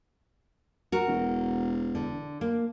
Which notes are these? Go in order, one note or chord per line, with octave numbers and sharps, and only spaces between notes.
F#4 A#4
E1
D3
A#3